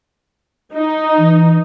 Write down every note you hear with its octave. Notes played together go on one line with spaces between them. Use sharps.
D#4
E3